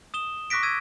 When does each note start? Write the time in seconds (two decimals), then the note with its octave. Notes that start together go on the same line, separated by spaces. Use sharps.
0.14 D#6 E7 G7
0.50 C#6 D6 F#6 A#6 B6 D7
0.63 E6 G#6 D#7